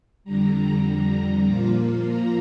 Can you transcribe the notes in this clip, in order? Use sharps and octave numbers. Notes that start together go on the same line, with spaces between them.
F2 D3 G3 A#5
A#2 F3 A#3 F4
A#5